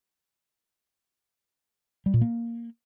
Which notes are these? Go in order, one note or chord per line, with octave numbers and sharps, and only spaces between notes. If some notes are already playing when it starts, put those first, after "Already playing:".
G3
A#2
A#3